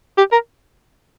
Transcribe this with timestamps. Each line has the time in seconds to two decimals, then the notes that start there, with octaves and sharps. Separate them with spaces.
0.18 G4
0.32 A#4